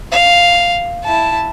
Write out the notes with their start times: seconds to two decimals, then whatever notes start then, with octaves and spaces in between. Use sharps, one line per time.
0.12 F5
1.04 E4 A5